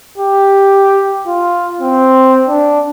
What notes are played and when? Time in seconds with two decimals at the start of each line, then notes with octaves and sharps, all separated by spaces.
0.18 G4
1.28 F4
1.82 C4
2.49 D4